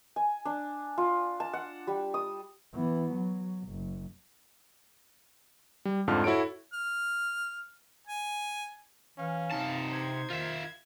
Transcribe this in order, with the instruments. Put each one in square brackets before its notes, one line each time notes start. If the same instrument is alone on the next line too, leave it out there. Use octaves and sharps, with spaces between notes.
[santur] G#5
D4
F4
A5
F#5
G3
D#6
[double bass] E3 B3
F#3
F#1
[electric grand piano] G3
F2 G#2 D3 F4 A5 F6
E4 F#4 A4 C#5 D7
[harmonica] F6
G#5
[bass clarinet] E3 [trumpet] C#4 [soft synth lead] F5
[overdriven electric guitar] C3 A5 [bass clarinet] D#4
[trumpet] C5 [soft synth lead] G#6
[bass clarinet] D#3 [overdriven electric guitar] F4 E5